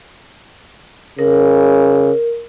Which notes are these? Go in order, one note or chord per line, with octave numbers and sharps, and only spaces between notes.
C#3 A#4